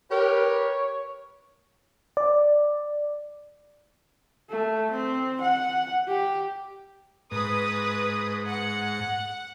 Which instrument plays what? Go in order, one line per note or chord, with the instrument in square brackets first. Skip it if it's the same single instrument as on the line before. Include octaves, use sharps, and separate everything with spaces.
[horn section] G4 A#4 B4 [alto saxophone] C#5
[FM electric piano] D5
[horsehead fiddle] A3
C4
F#5
G4
[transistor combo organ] G#2 [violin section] B4 D#6
[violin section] F#5